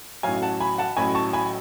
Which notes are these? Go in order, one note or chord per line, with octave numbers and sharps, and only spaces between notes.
A1 A2 F#3 F5 G#5
F#5 A5
G#5 B5
F#5 A5
A1 A2 F#3 G#5 B5
A5 C#6
G#5 B5